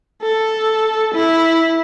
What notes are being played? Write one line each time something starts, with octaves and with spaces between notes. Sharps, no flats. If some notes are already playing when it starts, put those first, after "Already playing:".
A4
E4